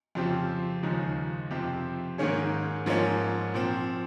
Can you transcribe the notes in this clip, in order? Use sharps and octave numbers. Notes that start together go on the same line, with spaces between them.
F2 C#3 F3 C4 G4
D#2 C#3 F3 G#3 D#4
F2 C3 F3 C4 G4
G#2 D#3 A#3 C#4 G#4
G#2 F3 A#3 C#4
A#2 F3 C4